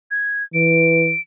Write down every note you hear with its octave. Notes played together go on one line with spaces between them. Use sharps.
G#6
E3 D7